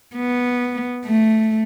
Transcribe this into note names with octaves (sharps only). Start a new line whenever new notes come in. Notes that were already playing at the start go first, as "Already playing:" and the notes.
B3
A3